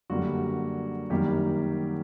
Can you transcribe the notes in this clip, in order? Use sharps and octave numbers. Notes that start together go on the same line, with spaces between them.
F#2 D3 G3 A#3 F#4
F#2 D#3 G3 A#3 G4